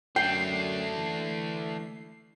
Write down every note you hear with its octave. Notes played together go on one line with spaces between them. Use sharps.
F#2 A3 D4 G5 C7
E3